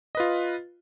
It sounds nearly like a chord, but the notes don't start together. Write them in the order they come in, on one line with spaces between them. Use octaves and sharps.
D#5 B4 F4